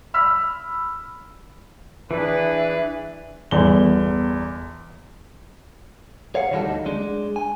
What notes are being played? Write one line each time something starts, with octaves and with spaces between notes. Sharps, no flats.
B5 E6 F6 B6
E3 D4 G#4 B4 E5
G1 E2 G7
C#5 F5 F#5
D#3 E3 G3 E4 F#4 A4
D2 D#4
G#3 D4
G#5